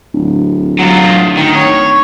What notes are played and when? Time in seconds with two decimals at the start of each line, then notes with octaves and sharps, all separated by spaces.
0.14 D1
0.79 F#3 F4
1.37 D#3
1.55 C#5